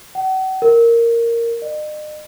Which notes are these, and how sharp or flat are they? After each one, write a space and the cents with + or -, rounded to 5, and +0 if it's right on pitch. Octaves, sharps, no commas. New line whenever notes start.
F#5 +40
A#4 -5
D#5 -45